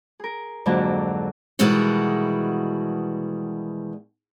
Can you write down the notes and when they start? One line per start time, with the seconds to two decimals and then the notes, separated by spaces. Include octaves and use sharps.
0.19 G#4 A#4
0.66 F2 G#2 D3 F#3 A#3
1.59 B2 D#3 E3 G3 G#3 F#4